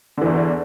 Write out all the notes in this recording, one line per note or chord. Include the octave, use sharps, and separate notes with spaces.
E2 D3 E3